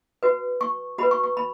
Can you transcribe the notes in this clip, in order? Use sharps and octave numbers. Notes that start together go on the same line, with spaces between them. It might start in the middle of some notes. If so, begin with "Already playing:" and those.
F#4 B4
C#6
F#4 B4 B5
C#6
C#6
B5